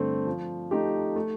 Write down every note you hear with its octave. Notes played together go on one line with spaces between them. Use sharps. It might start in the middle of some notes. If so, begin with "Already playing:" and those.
Already playing: G2 D3 A3 C4
F3
A3 D#4 G4
A3